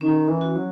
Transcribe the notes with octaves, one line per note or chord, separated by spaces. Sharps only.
D#3 C#4
E3
F#4
F#3